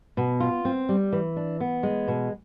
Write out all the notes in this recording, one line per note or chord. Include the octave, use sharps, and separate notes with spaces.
B2
F4
C4
G3
E3
D4
B3
G#3
B2